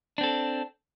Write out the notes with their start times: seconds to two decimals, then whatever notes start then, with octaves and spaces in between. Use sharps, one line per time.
0.18 D4
0.21 C4
0.23 A4